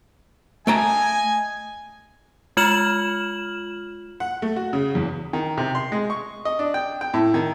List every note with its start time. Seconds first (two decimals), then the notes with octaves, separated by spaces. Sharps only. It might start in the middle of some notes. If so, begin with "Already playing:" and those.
0.67 A3 D#5 G5 G#5 A#5
2.57 G#3 F4 F6 E7 F#7
4.20 F#5
4.42 A3
4.56 F#4
4.73 C#3
4.95 E2
5.33 D#3
5.57 C3
5.75 C6
5.92 G#3
6.10 C#6
6.45 D#5
6.59 D4
6.74 G5
7.01 G5
7.14 A2
7.34 D#3